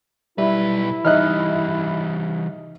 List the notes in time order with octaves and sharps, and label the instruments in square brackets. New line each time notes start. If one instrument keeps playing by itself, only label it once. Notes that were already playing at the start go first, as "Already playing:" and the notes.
[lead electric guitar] B1 B4 [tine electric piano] G3 [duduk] E4 [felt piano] E5
[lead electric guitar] E3 G3 [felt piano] D#4 D#5 E5 [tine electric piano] F6 F#6